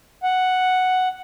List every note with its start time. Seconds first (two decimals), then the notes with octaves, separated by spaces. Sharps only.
0.23 F#5